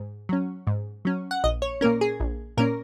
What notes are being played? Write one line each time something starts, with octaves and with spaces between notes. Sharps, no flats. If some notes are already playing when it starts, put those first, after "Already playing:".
Already playing: G#2
F#3 C#4
G#2
F#3 C#4
F#5
A#1 D#5
C#5
A#2 A#3 C#4 A#4
G#4
A#1
A#2 A#3 C#4 A#4